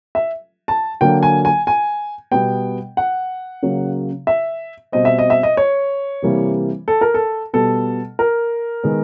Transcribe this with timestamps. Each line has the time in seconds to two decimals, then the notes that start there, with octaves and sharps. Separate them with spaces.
0.15 E5
0.68 A5
1.01 D3 F#3 A#3 G5
1.23 G#5
1.45 G#5
1.67 G#5
2.31 B2 G3 B3 G5
2.97 F#5
3.63 C#3 F#3 A#3
4.27 E5
4.92 B2 G3 C4 D#5
5.05 E5
5.19 D#5
5.30 E5
5.43 D#5
5.57 C#5
6.22 C3 E3 G3 A#3
6.88 A4
7.01 A#4
7.14 A4
7.53 B2 G3 B3 A4
8.19 A#4
8.83 D#3 G#3 B3